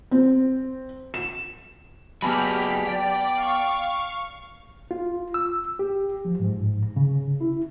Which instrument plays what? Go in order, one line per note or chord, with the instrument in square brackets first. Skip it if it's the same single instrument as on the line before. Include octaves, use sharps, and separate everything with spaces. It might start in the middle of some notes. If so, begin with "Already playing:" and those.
[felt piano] C4
E7
[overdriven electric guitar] F#3 G#4 [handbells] B3 A5 B5 [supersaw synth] G4 F6 B6
[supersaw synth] D5 [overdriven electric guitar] G5
[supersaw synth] F5 C#6
[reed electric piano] F4
E6
G4
F3
G#2
C#3
E4